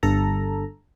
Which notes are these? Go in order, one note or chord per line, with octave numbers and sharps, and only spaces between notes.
G1 G2 A4 A#5